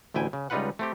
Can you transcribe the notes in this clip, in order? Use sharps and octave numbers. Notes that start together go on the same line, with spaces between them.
A1 D2 E4 G5 G#5
C#3
C#2 G3 D#4 F4 B4 F#5
A3 C4 G4